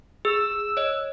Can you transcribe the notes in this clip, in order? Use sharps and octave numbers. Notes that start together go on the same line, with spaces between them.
G#4 E6
C#5 D#5